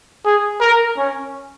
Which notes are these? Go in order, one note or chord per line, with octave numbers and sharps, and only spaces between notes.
G#4
A#4
C#4